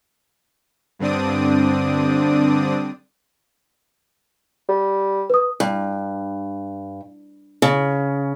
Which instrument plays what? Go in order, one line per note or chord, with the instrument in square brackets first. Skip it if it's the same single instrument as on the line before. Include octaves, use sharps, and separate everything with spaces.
[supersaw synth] G2 D3 C4 D4 D5 D#6
[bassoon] G3
[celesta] B4 D#6
[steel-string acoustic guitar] G2
C#3